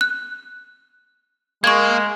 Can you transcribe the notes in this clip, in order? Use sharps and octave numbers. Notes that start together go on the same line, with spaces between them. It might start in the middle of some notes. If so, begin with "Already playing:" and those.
F#6
G#3 A#3 C#6 G#6